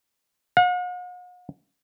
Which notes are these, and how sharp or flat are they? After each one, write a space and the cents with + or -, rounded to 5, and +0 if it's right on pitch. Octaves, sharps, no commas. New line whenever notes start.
F#5 -45